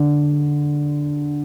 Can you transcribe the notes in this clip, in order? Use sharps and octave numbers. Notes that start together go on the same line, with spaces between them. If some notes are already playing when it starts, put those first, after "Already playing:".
Already playing: D3